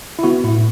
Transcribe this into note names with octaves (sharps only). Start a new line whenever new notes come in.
E4
B3 F#4
A2 E4